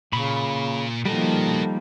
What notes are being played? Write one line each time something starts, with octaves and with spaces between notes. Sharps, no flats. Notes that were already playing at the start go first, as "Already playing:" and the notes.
A#2 C#3 B5 C#6
D#3 F3 G3 A#3 D#4 F#4 A4 D#5